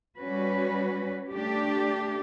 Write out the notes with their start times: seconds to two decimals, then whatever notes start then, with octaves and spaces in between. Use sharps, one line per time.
0.18 G3 C#4 F#4 B4
1.33 A3 D4 G4